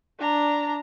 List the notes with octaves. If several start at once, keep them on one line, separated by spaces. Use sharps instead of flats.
D4 A#5